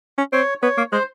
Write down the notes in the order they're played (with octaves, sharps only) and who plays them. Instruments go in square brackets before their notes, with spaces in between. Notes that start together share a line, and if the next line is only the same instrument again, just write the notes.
[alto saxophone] C#4
[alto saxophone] C4 [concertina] C#5
[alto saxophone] B3 [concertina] C#5
[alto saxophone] A#3
[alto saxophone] G#3 [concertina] C5